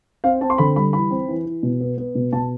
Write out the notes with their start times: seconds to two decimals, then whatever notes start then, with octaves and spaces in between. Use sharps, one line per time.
0.24 C4 F5
0.41 C4 A5
0.50 C6
0.58 D3 B5
0.76 G3 B5
0.93 E3 B5
1.11 C4
1.28 E3
1.46 E3
1.63 B2
1.80 B3
1.97 B3
2.15 B2
2.33 B2 A5